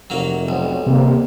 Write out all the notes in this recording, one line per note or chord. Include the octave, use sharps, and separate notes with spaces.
F1 F#3 A#3
B1 F#3 C4 D4
D#2 C3 G3 A#3